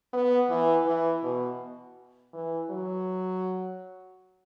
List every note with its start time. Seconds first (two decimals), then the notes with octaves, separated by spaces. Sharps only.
0.13 B3
0.50 E3
0.86 E3
1.23 B2
2.33 E3
2.70 F#3